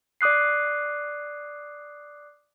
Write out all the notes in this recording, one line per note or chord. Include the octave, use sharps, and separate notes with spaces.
D5 D6 D#6 F#6 C7